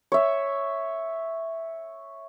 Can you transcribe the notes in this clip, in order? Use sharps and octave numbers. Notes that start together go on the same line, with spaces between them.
C#5 E5